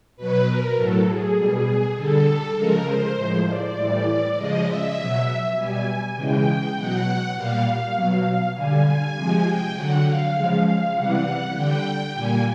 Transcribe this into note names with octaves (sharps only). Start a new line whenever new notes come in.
B2 F#3 B4
A#4
A2 F#3 A4
G#4
B2 G3
D3 G3 A4
C#3 F3 G#3 A#4
C5
A2 F3 G#3
D5
A2 E3 G3
C#3 F3 G#3 D#5
E5
B2 F#3
B2 G3 G#5
C#3 E3 G#3 G5
B2 F#3 F#5
A#2 G3 F5
F5
B2 F#3
D3 G3 G#5
G#5
C3 F3 G#3
G5
D3 F#3 F#5
F5
C#3 F3 G#3
F5
C3 E3 G3 F#5
D3 G3 G5
A#2 G3 G#5